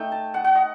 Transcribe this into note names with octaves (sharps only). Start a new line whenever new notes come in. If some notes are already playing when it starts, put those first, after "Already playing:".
Already playing: A3 D#4 G5
A5
F#5
F#5
D#5